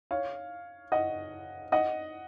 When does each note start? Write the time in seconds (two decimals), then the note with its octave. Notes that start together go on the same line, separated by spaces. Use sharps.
0.11 C#5 F5
0.92 D#5 F#5
1.72 D#5 F#5